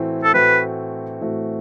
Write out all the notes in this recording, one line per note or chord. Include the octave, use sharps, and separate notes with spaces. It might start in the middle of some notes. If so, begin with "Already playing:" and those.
Already playing: A2 E3 A3 C4 F#4
A4
A2 E3 A3 C4 F#4 B4
A2 E3 A3 C4 F#4